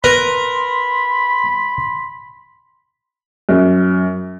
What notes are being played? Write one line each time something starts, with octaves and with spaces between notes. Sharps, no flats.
A#4 B4 B5 C6
F#2